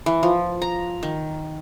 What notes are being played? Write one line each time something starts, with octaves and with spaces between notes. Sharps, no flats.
E3
F3
A#5
D#3